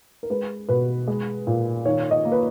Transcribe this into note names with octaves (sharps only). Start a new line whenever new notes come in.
A#4
G#3 B4
B2 B4
G#3
A#2
D#3 C#5
D#5
A#3
B4